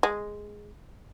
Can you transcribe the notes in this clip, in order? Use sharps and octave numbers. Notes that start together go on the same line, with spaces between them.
G#3